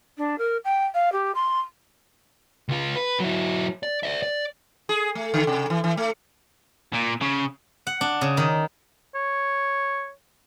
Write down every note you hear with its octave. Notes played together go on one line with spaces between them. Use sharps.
D4
A#4
G5
F5
G4
C6
C#2 F4
B4
F#3 E4
D5
D5 E5
D5
G#4
A3
D3
C3
E3
E3
A3
A#2
C#3
F#5
D4
C#3
D#3
C#5